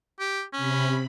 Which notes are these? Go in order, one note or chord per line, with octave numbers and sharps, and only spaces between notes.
G4
C3 C#4 B5